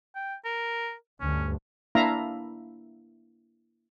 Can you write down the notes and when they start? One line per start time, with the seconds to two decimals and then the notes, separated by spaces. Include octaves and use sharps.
0.15 G5
0.45 A#4
1.21 D2 G2 C#4
1.95 A#3 D4 E4 E5 F5 A#5